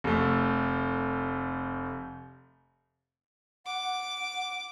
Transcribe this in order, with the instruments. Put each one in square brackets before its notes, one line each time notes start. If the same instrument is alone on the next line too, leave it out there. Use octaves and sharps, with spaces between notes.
[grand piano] F1 A3
[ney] F#5 [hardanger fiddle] D6